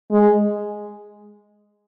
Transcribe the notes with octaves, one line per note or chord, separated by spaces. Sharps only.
G#3